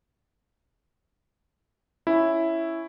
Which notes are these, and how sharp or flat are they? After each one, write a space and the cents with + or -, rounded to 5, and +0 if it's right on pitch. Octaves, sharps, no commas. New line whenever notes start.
C#4 +0 E4 +0